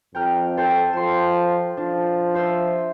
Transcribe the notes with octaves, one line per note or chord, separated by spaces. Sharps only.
F2 G5 A#5 F6
A4 C5 G5
F3 C6 E7
F3 D4
F4 C5 E5